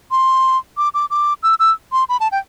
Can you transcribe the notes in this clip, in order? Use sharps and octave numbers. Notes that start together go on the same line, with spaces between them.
C6
D6
D6
D6
E6
E6
C6
B5
A5
G5